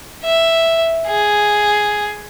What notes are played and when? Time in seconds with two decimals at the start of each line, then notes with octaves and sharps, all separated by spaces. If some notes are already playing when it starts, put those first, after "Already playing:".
0.24 E5
1.07 G#4